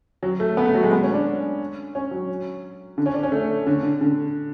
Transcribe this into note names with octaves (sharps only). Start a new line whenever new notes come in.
F#3
A3
B3
A3
F#3
G#3
B3
C#4
D4
C#4
F#3
D3
C#4
D4
C#4
A3
D3
D3
D3